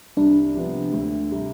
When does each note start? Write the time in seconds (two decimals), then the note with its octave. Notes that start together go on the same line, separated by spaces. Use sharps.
0.17 C2 D4
0.55 C3 F3 B3
0.93 D2
1.31 C3 G3